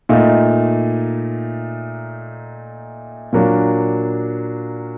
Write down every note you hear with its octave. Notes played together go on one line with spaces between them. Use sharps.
A#2 A3 D#4
A#2 F#3 A#3 D4